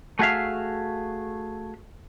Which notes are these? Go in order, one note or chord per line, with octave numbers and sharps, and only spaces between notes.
A3 F#4 G#4 E5 F5